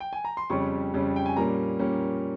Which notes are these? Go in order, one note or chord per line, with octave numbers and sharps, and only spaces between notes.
G5
G#5
A#5
C6
F2 C#3 G3 C#4 C#6
F2 C#3 G3 C#4
G5
G#5
A#2 G3 A#3 C#4 A#5
A#2 G3 A#3 C#4